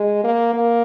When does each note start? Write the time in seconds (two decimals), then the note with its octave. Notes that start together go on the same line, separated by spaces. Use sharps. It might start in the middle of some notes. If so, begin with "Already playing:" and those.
Already playing: G#3
0.24 A#3
0.54 A#3